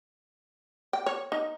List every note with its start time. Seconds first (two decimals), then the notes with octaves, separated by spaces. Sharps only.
0.93 G5
1.06 C#5
1.32 D#4